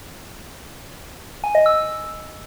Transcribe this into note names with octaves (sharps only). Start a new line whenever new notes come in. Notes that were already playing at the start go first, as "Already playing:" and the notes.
G#5
D#5
E6